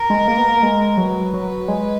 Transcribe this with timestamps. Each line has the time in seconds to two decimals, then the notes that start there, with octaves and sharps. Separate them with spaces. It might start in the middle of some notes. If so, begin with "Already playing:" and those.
Already playing: A#4
0.10 G#3
0.28 A#3
0.38 B3
0.48 A#3
0.63 G#3
0.97 F#3 B4
1.34 F#3
1.68 G#3